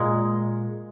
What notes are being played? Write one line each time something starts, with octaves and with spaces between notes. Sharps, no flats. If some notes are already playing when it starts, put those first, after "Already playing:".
Already playing: A#2 G#3